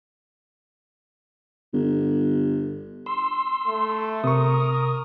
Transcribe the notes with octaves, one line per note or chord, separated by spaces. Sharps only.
G1
C6 E6
A3
C3 A#4 C#6 D#6